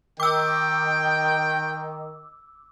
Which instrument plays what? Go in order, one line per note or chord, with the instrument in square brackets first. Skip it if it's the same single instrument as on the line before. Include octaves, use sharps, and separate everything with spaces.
[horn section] D#3 [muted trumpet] G5 [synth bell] D6 E6